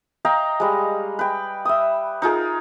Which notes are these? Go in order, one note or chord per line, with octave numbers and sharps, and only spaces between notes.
D#5 F5 G5 A#5
G3 G#3
B4 G5
E5 D#6
D#4 F4 G#4 A#4